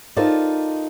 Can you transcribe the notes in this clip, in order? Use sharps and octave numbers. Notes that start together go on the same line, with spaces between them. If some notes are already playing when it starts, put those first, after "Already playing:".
D#4 F4 A4 A#4 C5 D5